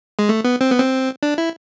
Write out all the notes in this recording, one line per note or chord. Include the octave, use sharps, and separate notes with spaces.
G#3
A3
B3
C4
B3
C4
D4
E4